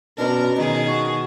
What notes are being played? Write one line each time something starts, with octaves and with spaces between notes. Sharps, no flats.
F#2 B2 C#4 D4 A#4
B2 D#3 D#4 G#4
F#4